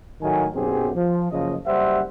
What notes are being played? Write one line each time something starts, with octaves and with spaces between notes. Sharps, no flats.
A2 D#3 F#3 A3 G#5
B1 F#2 B3 C4 G4 G#4
F3
F#1 C#3 F3 D#5
F#1 G3 C5 E5 F#5